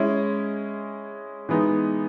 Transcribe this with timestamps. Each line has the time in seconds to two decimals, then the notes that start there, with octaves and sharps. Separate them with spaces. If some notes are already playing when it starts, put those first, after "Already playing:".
Already playing: G#3 C#4 E4
1.49 E3 G#3 B3 D#4